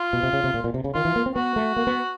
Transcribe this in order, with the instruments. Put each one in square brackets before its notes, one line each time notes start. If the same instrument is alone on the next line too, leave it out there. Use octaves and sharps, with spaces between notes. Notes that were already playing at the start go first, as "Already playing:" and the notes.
Already playing: [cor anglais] F4
[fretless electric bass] B2
C3
C#3
C3
A#2
A#2
C3
C#3
[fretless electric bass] D#3 [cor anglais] F4
[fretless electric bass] E3
A#3
C4
[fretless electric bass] B3 [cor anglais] F#4
[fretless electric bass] A3
A#3
B3